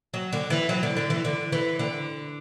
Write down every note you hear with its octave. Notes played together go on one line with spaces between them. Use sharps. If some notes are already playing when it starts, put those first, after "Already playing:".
F#3
D3
E3
F#3
D3
D3
E3
D3
E3
D3